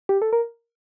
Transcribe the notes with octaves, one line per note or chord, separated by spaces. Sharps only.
G4
A4
A#4